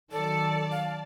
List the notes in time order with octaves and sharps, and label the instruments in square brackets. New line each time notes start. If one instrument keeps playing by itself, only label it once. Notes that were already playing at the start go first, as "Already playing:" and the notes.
[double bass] D#3 F#3 [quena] A4 [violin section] D5 A5
[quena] F5